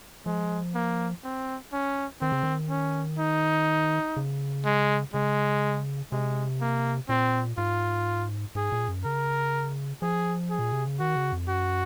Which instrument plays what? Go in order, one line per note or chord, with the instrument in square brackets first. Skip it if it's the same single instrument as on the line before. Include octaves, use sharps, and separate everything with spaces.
[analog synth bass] F3 [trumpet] G#3
[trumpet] A#3
C4
C#4
[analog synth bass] D#3 [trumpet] C4
[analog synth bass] C#3
D#3
[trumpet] C#4
D#4
[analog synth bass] C#3
[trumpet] G#3
[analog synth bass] C#3 [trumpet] G#3
[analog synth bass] C3 [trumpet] G#3
[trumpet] A#3
[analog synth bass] A#2 [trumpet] C4
[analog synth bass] G#2 [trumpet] F4
[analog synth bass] G#2 [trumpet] G#4
[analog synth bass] A#2
F#2
[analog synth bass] C#3 [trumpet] A#4
[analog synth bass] F3 [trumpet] G#4
[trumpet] G#4
[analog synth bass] A#2
C3
C#3
[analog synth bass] D#3 [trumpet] F#4
[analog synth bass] C#3
F2
[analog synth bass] F#2 [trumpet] F#4